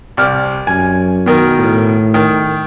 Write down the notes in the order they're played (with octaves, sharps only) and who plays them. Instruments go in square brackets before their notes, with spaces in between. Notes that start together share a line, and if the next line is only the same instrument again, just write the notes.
[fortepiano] C2 D5 F6
[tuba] F#2 [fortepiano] G#5
[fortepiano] B2 D#3 A#4
[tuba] A2
[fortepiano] D#3